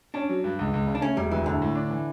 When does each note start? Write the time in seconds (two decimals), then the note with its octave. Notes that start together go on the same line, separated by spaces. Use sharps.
0.14 C#4 D4
0.29 F#3
0.44 G2
0.59 C#2
0.74 C#2
0.87 C#3
0.95 D4
1.02 A3 C#4
1.17 E1 G3
1.31 D2 E3
1.46 A2 D3
1.62 A2
1.75 D4
1.91 E3